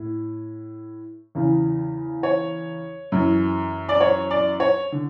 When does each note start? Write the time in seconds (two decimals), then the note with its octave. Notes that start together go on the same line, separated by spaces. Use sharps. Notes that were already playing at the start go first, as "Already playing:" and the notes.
Already playing: A2
1.35 E2 C#3 E3
2.23 C#5
3.12 F#2 E3
3.89 D5
4.00 C#5
4.31 D5
4.60 C#5
4.92 D3